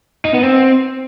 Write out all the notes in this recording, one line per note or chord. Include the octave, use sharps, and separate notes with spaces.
D#4
B3
C4